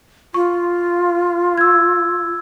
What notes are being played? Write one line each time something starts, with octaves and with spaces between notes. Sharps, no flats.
F4 C#6
E6 G#6